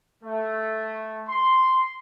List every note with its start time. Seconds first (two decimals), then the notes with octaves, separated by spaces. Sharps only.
0.24 A3
1.27 C6